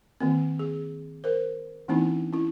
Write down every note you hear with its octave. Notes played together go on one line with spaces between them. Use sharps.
D#3 A#3 C4
G#4
A#4 C5
E3 A#3 C4 C#4 D#4 E4
C#4 E4